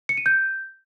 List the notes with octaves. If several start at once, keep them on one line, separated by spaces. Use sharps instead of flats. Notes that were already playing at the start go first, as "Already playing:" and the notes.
C#7
D#7
G6